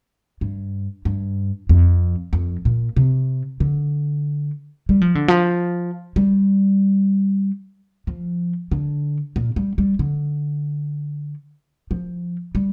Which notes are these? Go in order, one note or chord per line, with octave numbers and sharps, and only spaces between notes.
G2
G2
F2
F2
A#2
C3
D3
G3
F3
D3
F3
G3
F3
D3
A#2
G3
G3
D3
F3
G3